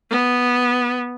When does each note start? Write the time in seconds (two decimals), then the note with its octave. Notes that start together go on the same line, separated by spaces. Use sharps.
0.10 B3